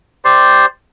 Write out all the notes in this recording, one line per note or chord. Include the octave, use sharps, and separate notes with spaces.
G4 C5 D5 C6